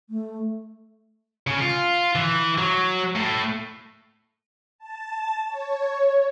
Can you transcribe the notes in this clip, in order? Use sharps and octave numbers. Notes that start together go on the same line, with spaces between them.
A3
C#3
F4
E3
F#3
A2
A5
C#5